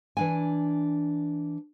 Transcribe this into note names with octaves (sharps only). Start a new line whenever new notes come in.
E3 D4 G#5